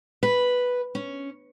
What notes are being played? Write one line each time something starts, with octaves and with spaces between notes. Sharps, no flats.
B4
C#4